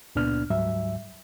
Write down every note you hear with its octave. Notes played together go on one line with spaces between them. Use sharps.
C#2 A#2 B3 D4 F6
D2 G#2 F#3 G3 E5